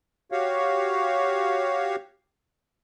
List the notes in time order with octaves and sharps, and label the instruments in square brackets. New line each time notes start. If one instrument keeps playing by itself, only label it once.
[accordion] F#4 G4 C#5 F5